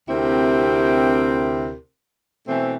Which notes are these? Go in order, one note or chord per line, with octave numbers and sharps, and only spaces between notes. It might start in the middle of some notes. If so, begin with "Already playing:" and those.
D2 C3 C4 E4 G4 A#4
B2 E3 A3 C4